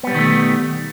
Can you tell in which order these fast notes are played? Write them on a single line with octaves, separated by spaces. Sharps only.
B3 G3 B2 D#3 A3